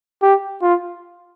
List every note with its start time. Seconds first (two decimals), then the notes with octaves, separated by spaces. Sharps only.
0.22 G4
0.62 F4